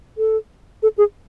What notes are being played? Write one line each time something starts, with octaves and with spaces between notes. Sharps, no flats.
A4
A4
G#4